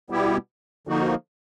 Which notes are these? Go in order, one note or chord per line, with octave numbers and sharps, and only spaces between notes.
B2 G3 B3 E4 G4
D3 F3 A#3 D#4 F#4